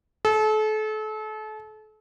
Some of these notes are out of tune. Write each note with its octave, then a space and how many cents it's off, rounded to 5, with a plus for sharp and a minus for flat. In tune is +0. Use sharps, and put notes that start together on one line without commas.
A4 -35